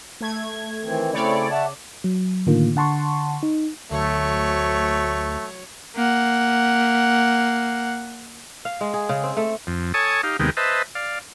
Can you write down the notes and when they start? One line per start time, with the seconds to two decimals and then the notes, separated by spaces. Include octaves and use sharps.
0.20 A3 G#6
0.84 D#3 E3 C4
1.13 C#3 A3 C4 E4 C#5 D5
1.51 E5 F#5 A5
2.04 F#3
2.47 A2 D3 D#3 A#3 F4
2.76 D3 F#5 A5 C6 C#6
3.43 D#4
3.91 D2 F#3 A3 C#5
5.96 A#3 F#5
8.65 F5
8.81 G#3
8.94 G#4
9.09 C#3
9.23 C4
9.37 A3
9.67 F2
9.94 A4 C#5 G#5 A5 C#6 D#6
10.23 D#4 G4 F5
10.39 D#2 C3 D#3 G#3 B3 G5
10.57 B4 C5 D#5 E5 A5
10.95 D5 F5